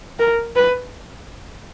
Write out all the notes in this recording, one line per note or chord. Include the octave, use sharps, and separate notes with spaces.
A#4
B4